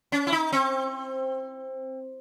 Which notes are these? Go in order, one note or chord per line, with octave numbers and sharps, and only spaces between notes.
C#4
E4
D#4
C4